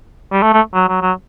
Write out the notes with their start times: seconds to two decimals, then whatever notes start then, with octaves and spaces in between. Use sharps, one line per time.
0.32 G3
0.42 A3
0.53 A3
0.74 F#3
0.88 F#3
1.02 F#3